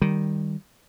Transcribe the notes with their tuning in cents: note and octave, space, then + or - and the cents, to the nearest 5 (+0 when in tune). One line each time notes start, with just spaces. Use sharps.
D#3 +0 G3 +0